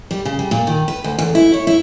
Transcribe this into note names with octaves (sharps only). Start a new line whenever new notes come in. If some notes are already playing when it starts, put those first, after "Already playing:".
G3
C#3
G3
A#2
D#3
B4
D2
E2
E4
C#5
E4